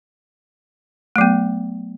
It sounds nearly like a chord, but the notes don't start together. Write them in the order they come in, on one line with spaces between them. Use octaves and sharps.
A3 F#3 B3